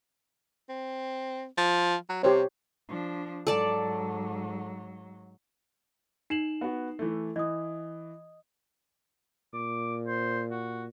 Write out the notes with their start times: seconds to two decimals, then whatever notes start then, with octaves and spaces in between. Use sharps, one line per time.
0.69 C4
1.58 F3
2.09 F#3
2.23 C3 G4 C5 C#5
2.89 F3 D4
3.47 G#2 F#3 A4 D5 A5
6.30 D#4 C7 E7 F#7
6.61 B3 F#4
6.99 E3 A3
7.36 E3 D#5 D#6
9.54 A#2 D6
10.07 C5
10.51 F#4